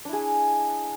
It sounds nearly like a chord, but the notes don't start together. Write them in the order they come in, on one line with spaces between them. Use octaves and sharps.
D4 E4 G#4